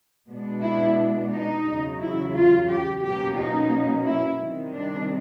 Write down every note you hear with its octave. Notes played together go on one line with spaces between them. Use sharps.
B2 G#3 B3 D4
E4
D#4
E2 C#3 F#3
E4
F4
G4
B2 F#3 A#3 C#4 G4
D#4
E4
C3 D#3 G3
D4